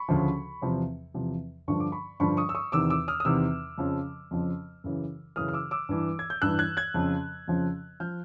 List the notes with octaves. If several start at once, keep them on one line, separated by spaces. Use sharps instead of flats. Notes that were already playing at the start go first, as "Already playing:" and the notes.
Already playing: B5 C#6
D2 C#3 F3
E2 C3 F3
E2 C3 F3
G2 D3 F3 C#6
D6
B5 C#6
G2 D3 F3 B5 C#6
C#6 D#6
E6
C#6 D#6
E2 C3 D#3 D6 E6
D6 E6
D#6 F6
D#6
E2 C3 D#3 D6 E6
F2 C#3 F3
F2 C#3 F3
F#2 C#3 E3
F#2 C#3 E3 D#6 F6
F6
D6 E6
D6 E6
G2 E3
G#6
G6
G2 E3 E6 F#6
F#6 G#6
F#6 G#6
F2 C#3 F3
F2 C#3 F3
F3 F6 G6